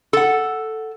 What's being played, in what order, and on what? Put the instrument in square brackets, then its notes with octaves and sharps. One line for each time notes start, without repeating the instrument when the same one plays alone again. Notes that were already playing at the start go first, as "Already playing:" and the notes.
[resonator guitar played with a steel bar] A4 F#5